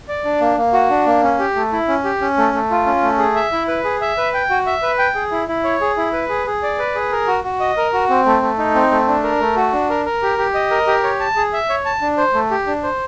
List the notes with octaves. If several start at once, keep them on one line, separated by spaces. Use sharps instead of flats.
D5
D4
A#3
A#3
F#4
D4
A#3
C#4
G4
A3
E4
C#4
G4
C#4
A3
A3
F4
C#4
A3
G#4
E5
E4
B4
G#4
E5
B4
G5
F#4
E5
B4
G5
G#4
E4
E4
C#5
G#4
E4
B4
G#4
G#4
D5
B4
G#4
A#4
F#4
F#4
D#5
A#4
F#4
C4
A3
A3
D#4
C4
A3
D4
A#4
A3
F#4
D4
A#4
A#4
G4
G4
D#5
A#4
G4
C#5
A5
G#4
E5
C#5
A5
D4
C5
A3
G4
D4
C5